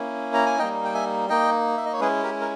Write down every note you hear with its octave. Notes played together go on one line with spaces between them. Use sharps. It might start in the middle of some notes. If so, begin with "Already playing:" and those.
Already playing: A#3 C#4 E4
A#5
G#5
G3 A#3 D#4 D#5 G5
G5
E5 G#5
A#3 D#4 D#5 G5
E5
D#5
C#5
G#3 C#4 E4 G#4 B4
G4 A#4
A#4